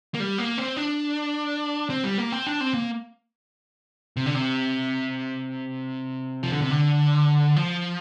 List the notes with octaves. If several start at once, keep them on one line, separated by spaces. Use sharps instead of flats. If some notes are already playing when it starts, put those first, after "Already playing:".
A#3
G3
A#3
C4
D4
C4
G3
A#3
C4
D4
C4
A#3
C3
D3
C3
F3
D3
C3
D3
F3